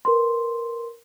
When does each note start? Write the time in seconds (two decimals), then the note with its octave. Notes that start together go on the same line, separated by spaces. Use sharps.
0.05 A#4 B4 C6